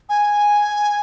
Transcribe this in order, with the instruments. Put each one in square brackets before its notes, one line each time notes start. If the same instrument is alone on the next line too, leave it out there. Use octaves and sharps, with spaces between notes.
[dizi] G#5